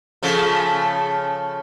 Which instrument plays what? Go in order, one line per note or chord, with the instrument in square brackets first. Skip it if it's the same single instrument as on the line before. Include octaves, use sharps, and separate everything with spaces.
[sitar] C#3 F3 A3